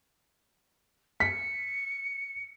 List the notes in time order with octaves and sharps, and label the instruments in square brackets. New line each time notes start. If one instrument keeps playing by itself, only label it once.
[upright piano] B6 [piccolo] C#7